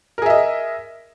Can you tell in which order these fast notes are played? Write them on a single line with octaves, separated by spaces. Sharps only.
A#4 G#4 E5 D#5